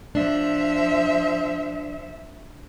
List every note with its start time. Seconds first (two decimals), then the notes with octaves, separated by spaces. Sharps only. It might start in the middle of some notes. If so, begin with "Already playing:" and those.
0.15 F3 D4 E5